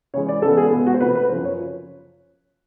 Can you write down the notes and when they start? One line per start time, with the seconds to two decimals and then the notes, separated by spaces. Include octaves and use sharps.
0.14 C#3 E3 G#3 C#5
0.28 D5
0.42 C#3 E3 G#3 B3 A4
0.57 G#4
0.72 B2 G#3 B3
0.86 F#4
0.94 C5
1.01 C3 F3 A3 B4
1.15 B4
1.29 F#2 C#3 F3 C5
1.45 C#5